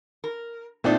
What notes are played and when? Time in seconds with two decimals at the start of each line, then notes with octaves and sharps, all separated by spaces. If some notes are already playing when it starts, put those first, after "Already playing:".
0.24 A#4
0.84 A#2 A3 C4 D4 D#4